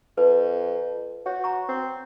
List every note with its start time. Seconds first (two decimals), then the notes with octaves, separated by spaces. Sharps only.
0.17 F2 B4
1.26 F#4 C#5
1.44 A#5 C#6
1.69 C4